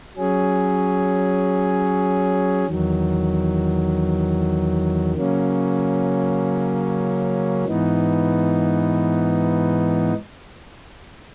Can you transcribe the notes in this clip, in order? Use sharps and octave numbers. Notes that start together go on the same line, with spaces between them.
F#3 C#4 G#4
E2 D#3 F#3
C#3 F#3 A#3 C#4
G#2 E3 B3 D#4